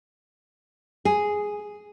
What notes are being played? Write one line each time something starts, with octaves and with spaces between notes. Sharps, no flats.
G#4